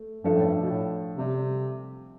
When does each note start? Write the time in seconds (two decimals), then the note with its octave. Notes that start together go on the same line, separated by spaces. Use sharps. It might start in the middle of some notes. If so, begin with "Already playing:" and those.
Already playing: A3
0.24 G2 F3 A3 D4 A4
0.35 A2
0.45 G2
0.62 B2
0.71 A2
1.16 C3 G3 C4 G4 D5